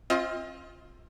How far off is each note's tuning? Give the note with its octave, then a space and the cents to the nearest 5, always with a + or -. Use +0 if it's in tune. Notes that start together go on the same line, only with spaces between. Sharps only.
C4 +35 F4 +0 D#5 +35